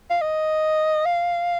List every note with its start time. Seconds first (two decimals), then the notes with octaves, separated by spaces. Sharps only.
0.10 F5
0.21 D#5
1.05 F5